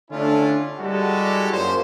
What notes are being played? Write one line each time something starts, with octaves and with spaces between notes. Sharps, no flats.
D3 A3 C#4 D4 E4 F4
G3 G#3 E4 F#4 G4 A4
F#2 A#2 C5